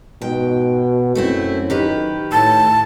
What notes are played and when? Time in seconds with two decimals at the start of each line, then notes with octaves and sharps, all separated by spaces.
0.21 G#2 B2 G5
1.15 F#2 A3 C4 E4
1.70 D#3 G4 B4
2.32 A2 A5